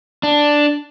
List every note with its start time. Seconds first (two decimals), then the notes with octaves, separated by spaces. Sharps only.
0.23 D4